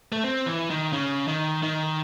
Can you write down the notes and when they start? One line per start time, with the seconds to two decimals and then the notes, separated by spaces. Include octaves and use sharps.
0.12 A3
0.24 C4
0.46 E3
0.70 D#3
0.93 C#3
1.28 D#3
1.63 D#3